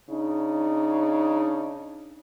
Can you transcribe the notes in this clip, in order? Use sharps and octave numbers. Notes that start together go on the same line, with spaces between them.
C#3 D4 D#4